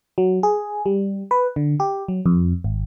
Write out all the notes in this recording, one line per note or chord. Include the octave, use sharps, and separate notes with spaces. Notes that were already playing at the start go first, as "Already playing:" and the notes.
F#3
G#4
G3
B4
D3
G4
F#3
F2
G#1